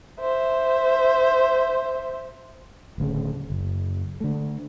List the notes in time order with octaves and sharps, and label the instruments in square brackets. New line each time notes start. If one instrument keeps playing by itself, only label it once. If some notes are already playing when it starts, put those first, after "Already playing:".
[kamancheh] C5 E5
[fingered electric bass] D1 D2 C#3
F#1
D3 A3